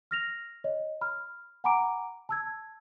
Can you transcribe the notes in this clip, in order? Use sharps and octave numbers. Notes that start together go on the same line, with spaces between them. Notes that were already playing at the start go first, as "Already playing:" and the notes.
F6 A#6 F7
C#5 D#5
B5 F6
F#5 G#5 A#5 B5 D6 D7
A5 E6 G#6